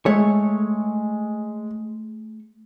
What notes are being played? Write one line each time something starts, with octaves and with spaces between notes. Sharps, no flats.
G#3 A3 C#5